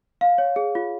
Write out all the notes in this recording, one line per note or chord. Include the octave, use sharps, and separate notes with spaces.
F5
C#5
G#4
F4